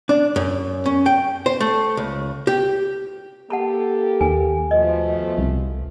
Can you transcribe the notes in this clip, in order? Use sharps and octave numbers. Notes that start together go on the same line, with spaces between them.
D4
F#2
C#4
G5
C5
A3
C#2
G4
A#3 G4 A4 F#5 A5 B5
D#2 G#5
B2 F3 A3 D#5
C2